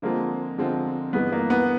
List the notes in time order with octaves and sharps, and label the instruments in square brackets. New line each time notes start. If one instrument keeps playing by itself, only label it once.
[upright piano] D3 F3 G#3 C4 F4 [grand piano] A#3
[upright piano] D3 F3 G#3 C4 F4
[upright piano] G2 E3 G#3 [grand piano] B3
[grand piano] A#3
B3